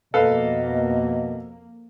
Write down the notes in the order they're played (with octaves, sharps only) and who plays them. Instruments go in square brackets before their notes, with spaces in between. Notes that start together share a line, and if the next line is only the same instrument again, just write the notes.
[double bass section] F2 A#3 [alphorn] B2 [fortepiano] A4 B4 F5 [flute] D#5